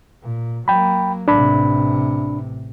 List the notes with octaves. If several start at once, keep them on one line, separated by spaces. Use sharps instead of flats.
A#2
F#3 A#3 G5 B5
A1 C3 D4 B5